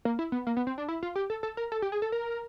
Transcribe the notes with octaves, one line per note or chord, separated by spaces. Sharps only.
A#3
E4
B3
A#3
B3
C4
D4
E4
F4
G4
A4
A4
A#4
A4
G4
G#4
A4
A#4